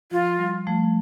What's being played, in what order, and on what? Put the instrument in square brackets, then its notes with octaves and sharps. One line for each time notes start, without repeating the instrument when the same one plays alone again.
[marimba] F3 [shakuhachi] F4
[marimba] G3
F3 A3